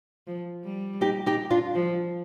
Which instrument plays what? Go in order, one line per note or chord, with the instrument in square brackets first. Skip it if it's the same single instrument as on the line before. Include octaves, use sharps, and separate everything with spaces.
[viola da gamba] F3
G3
[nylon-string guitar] D#4 G4
D#4 G4
D4 F4
[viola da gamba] F3